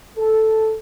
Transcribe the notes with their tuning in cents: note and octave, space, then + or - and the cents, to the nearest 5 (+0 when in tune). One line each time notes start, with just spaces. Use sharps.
A4 -5